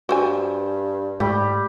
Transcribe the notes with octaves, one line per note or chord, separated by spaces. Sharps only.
G2 F#4 C5 G#5
G#2 G3 A3 G4